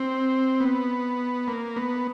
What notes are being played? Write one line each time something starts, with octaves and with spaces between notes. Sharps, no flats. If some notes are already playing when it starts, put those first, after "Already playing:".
Already playing: C4
B3
A#3
B3